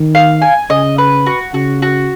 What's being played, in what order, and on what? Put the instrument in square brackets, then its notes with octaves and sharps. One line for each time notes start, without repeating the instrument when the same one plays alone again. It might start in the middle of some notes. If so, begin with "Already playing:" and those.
Already playing: [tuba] D#3
[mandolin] F5
G#5
[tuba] C#3 [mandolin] D#5
[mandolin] B4
F#4
[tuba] C#3 [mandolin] F#4
[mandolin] F#4